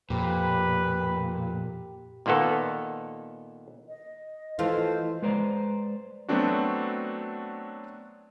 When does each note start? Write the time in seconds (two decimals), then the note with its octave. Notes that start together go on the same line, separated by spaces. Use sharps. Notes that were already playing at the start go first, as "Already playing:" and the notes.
0.10 F2 A#2 G4 B4
2.26 A#2 D#3 A#3 B3 A4
3.88 D#5
4.59 E3 A3 F4 C5
5.22 G#3 B4 C5 D5 A#5
6.29 F#3 A3 B3 C4 D4 F#4